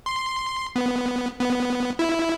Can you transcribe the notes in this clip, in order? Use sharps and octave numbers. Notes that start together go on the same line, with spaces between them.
C6
B3
B3
E4